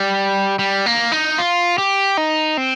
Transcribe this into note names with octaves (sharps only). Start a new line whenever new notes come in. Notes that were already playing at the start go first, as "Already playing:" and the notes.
Already playing: G3
G3
A#3
D#4
F4
G4
D#4
C4